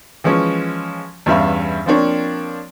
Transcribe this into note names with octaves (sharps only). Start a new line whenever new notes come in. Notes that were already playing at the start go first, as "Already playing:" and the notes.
E3 F3 G#3 C#4
E2 G2 C#4 E5 F5 B5
F3 A#3 C4 D4 C#5